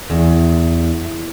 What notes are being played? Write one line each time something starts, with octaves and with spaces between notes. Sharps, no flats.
E2